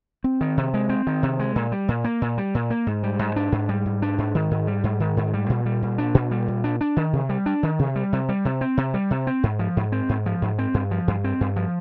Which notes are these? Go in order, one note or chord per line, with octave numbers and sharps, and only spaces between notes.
C4
D#3
C3
G#3
C4
D#3
C3
G#3
A#2
G3
A#2
A#3
A#2
G3
A#2
A#3
G#2
G3
G#2
D4
G#2
G3
G#2
D4
G#2
D#3
G#2
G3
G#2
D#3
G#2
G3
A#2
G3
A#2
D4
A#2
G3
A#2
D4
D4
D#3
C3
G3
D4
D#3
C3
G3
C3
G3
C3
C4
C3
G3
C3
C4
G#2
F3
G#2
C4
G#2
F3
G#2
C4
G2
F3
G2
C4
G2
F3